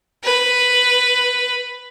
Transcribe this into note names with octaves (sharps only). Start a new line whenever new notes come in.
B4